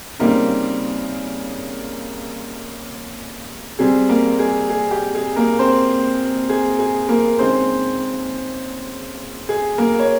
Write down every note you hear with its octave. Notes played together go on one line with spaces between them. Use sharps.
C#3 G3 A#3 C4 D#4 A#4
C3 G3 C4 G#4
A#3 A#4
G#4
G#4
G4
G#4
A#3 A#4
C4 C5
G#4
G#4
A#3 A#4
C#3 G#3 C4 D#4 C5
G#4
A#3 A#4
C#5